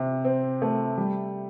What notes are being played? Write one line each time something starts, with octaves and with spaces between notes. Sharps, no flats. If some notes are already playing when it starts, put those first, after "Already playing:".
Already playing: C3 C4
C4
A3
G3